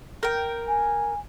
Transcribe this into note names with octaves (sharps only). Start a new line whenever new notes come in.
A#4 G5
G#5